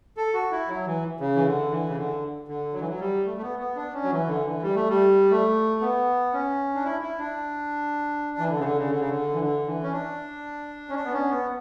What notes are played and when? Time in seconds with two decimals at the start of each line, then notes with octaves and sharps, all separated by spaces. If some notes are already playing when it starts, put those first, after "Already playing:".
0.17 A4
0.34 F#4
0.51 E4
0.68 F#3
0.86 E3
1.20 C#3
1.35 E3
1.46 D3
1.71 E3
1.88 C#3
1.97 D3
2.48 D3
2.73 F#3
2.80 E3
2.88 F#3
2.99 G3
3.25 A3
3.37 A3
3.42 B3
3.59 B3
3.76 D4
3.93 C#4
4.03 F#3
4.11 E3
4.28 D3
4.45 E3
4.62 G3
4.75 A3
4.89 G3
5.31 A3
5.81 B3
6.33 C#4
6.75 D4
6.85 E4
7.01 E4
7.18 D4
8.38 E3
8.50 D3
8.59 C#3
8.63 D3
8.77 C#3
8.90 D3
8.99 C#3
9.10 D3
9.33 E3
9.41 D3
9.66 E3
9.83 C#4
9.92 D4
10.89 C#4
10.95 D4
11.05 B3
11.12 C#4
11.29 B3